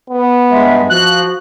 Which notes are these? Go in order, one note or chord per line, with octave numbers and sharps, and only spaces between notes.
B3
G2 G#3 E5
F3 F#4 F#6